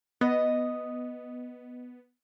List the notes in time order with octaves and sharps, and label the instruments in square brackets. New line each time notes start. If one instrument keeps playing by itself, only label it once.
[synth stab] B3 [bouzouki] D#5